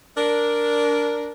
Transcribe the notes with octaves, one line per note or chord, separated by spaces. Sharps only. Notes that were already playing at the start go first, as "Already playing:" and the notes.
D4 A#4